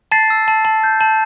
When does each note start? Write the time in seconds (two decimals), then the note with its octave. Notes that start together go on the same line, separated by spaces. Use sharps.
0.12 A5 A6 C7
0.30 E6
0.48 A5
0.65 A5
0.84 G6
1.01 A5